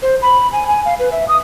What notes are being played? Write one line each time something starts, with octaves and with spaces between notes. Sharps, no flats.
C5
B5
G#5
G#5
F5
B4
E5
D#6